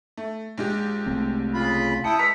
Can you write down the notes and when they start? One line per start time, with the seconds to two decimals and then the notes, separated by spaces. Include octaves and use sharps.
0.17 A3
0.58 A#1 G#3 G4
1.06 C2 A3 C4
1.54 C#3 F4 B5
2.04 E4 G5 A5 D#6 C#7
2.18 G#3 B4 A#5 E6 B6 C#7